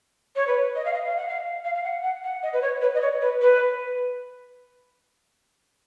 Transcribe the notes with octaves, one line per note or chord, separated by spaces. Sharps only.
C#5
B4
D#5
F5
D#5
F5
F#5
F5
F5
F5
F#5
F#5
F#5
D#5
B4
C#5
B4
D#5
C#5
B4
B4